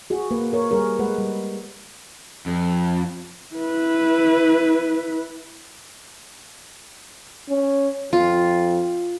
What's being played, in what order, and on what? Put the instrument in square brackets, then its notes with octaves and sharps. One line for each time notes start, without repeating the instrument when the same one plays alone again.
[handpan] F#4 G#4
A#3 B4
A#4 C#5
G3 G#4 A#4 C#5
G#3 B4 F#5
G3
[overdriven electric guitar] F2
[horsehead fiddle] E4 B4
[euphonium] C#4
[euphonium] F2 [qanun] F4